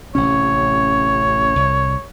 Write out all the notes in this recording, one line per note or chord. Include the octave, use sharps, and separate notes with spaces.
A1 C3 C#4 C#5
C2